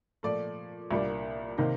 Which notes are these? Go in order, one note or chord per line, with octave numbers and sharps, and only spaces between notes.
A#2 F3 A3 D5
C2 A#2 G3 A#3 D4
C3 D#3 A#3 D#4